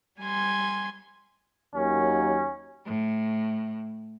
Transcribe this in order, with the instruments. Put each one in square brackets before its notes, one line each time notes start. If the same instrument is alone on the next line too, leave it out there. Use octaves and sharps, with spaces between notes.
[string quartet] G3 G#5 C6 G#6
[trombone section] D#2 D#3 F#3 [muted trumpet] C#4
[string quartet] A2